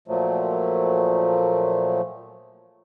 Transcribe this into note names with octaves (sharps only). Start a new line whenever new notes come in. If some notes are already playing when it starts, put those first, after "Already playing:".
A#2 F3 F#3 A3